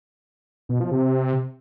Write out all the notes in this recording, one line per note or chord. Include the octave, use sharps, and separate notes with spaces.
B2
F3
C3